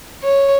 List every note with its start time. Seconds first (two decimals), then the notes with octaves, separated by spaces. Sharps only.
0.23 C#5